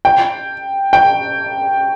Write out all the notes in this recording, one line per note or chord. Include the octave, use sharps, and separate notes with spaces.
G5
G5